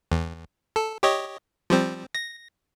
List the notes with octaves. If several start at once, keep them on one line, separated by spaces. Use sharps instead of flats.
E2
A4
G4 C#5 D#5
F3 G3 C4
A#6